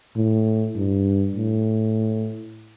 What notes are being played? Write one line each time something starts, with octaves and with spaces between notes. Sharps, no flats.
A2
G2
A2